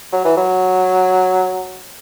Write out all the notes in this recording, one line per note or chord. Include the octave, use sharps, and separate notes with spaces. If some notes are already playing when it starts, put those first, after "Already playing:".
F#3
E3
F#3